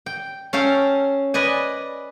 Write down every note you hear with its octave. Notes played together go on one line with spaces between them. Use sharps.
G5
C#4 A4 F5 G5
B4 D5 D#5 G#5